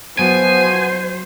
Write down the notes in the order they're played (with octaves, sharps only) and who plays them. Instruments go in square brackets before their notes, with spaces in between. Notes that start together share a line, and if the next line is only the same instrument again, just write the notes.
[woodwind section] B2 F3 B3 [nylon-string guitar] F#3 [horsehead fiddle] C5 [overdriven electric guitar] G#5